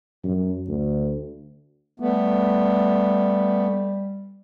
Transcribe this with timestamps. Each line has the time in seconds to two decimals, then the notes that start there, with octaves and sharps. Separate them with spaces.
0.24 F#2
0.68 D2
2.00 G3 A3 B3